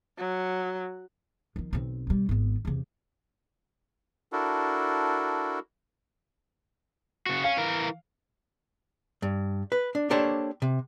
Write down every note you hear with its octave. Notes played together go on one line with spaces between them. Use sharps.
F#3
D#3 F3
B1 C4
B2 G3
G#1 B3
E2 C3
D4 E4 F#4 A4 A#4
C#3 F#4
C#4 F5
E3 A#4
G2
B4
D4
A#3 D4 G4 A4 C5 C#5
C3